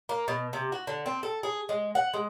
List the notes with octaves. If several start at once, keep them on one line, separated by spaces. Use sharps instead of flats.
A#3
B2
C3
F#4
D3
C4
A4
G#4
G#3
F#5
G#3